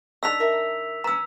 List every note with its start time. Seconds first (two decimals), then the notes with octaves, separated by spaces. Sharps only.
0.23 D#3 D4 A4 E6 B6 F7
0.40 A#4 E5
1.04 C#4 B4 A#5 E6